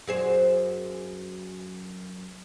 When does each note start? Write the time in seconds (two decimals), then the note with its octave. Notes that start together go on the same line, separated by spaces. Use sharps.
0.07 F#2 G#4 C5